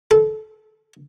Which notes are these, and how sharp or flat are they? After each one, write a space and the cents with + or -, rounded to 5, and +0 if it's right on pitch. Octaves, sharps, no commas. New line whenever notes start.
A4 -25